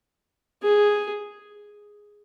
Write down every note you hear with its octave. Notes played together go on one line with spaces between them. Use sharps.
G#4